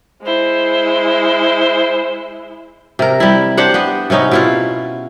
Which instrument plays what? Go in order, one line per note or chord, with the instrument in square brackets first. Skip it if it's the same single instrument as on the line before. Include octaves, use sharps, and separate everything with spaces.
[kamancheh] G#3 E4 [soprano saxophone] C5
[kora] C3 A#4
G3 E4
D4 G4 C5 F#5
B3 G4
C3 B3 C#4 D#4
B2 E4 F4